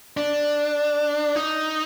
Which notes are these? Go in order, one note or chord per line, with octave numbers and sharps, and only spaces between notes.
D4
D#4